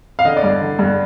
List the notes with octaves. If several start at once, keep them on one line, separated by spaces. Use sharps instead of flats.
F5
D3 D#5
D5
G2
D3
G2